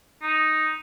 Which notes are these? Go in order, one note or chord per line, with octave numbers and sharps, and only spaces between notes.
D#4